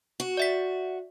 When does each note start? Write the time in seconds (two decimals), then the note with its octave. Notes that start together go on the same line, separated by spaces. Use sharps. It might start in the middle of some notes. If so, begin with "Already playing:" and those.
0.20 F#4
0.37 D5 E5 B6